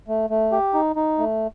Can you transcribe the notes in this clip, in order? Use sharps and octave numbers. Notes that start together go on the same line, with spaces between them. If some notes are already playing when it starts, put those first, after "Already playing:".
A3
A3
G4
D#4
D#4
A3